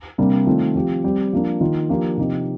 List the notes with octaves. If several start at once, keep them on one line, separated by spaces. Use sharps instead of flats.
C3 G3 A#3 D4
D#3 A3 C4 F4
F3 C4 G4
G3 C4 G4
F3 A#3 D4
D#3 A#3 F4
F3 A#3 D4 G4
C3 F3 C4 D#4 G4